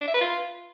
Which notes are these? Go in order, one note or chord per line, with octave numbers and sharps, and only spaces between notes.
D4
E5
B4
F4